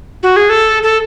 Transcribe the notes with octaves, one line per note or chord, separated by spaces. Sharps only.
F#4
G#4
A4
A4